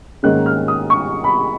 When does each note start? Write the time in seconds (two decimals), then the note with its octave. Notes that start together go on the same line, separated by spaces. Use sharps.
0.23 G#2 D#3 A#3 C#4 F#6
0.46 F6
0.68 D#6
0.90 C#6
1.24 B5